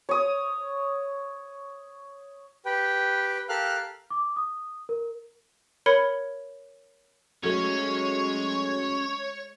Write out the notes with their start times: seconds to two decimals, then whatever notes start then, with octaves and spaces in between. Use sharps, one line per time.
0.09 C#5 D#6
2.65 G4 B4 G5
3.49 G4 A4 A#4 F5 F6 F#6
4.11 D6
4.36 D#6
4.89 A#4
5.86 A#4 C#5 B5 G#6 C#7
7.44 F#3 G#3 A3 C#4 C#5